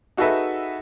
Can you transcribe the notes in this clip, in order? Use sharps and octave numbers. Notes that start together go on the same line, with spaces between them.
D#4 F#4 G#4 A4 B4 E5